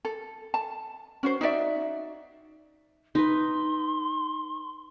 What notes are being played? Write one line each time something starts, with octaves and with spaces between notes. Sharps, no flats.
A4
A5
C#4 F#4 C5
D#4 F#4 D5 E5
D#4 B4 C6